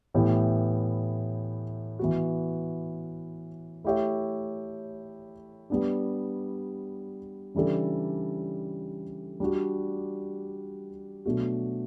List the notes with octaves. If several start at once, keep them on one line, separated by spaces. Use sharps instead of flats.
A2 E3 B3 E4 G4
E3 B3 F#4
A3 E4 G4 C#5 E5
G3 B3 D4
C#3 E3 G3 D4 A4
G3 D4 F#4
B2 F#3 A3 D4 F#4